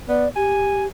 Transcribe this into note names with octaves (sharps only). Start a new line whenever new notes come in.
B3 D5
G4 G#5